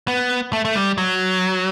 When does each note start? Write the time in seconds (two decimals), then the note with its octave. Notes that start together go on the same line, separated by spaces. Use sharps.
0.08 B3
0.53 A3
0.65 A3
0.76 G3
0.98 F#3